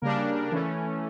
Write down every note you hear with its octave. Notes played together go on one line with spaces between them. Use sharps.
C#3 G3 A#3 D4 A#4
E3 A3 C#4